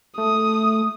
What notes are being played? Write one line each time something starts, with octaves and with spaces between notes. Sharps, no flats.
A3 D#6